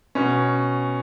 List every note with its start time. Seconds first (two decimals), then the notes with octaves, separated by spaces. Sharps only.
0.15 B2 C#4